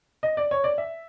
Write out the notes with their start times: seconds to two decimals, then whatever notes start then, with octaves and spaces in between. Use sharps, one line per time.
0.23 D#5
0.37 D5
0.51 C#5
0.64 D5
0.78 E5